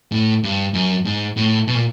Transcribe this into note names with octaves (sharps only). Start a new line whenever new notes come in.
A2
G2
F#2
G#2
A2
B2
A#2